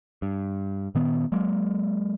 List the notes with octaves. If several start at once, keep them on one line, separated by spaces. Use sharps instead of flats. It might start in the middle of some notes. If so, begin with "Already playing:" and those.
G2
A#2 D#3 B3
F#3 G#3 A#3